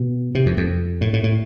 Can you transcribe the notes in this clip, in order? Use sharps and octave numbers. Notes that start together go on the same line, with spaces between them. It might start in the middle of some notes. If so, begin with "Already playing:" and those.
Already playing: B2
C3
F2
F2
A2
A2
A2